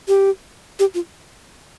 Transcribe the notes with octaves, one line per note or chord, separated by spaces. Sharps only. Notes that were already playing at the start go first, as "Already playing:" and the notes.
G4
G4
F4